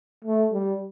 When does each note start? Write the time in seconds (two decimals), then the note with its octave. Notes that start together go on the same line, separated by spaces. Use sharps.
0.24 A3
0.53 G3